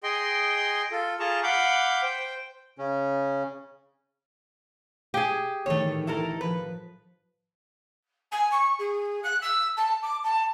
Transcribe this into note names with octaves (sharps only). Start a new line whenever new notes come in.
G#4 D#5 G5 C6
F4 A4
F4 G#4 A5 A#5 C#6
F5 F#5 B5 D6 G6
C5 G5
C#3 C#4
G4 G#4
A2 D#3 E3 A3 C#5
E4 A4 A#4
F3 B4
G#5
C#6
G#4
F#6
E6
A5
D6
A5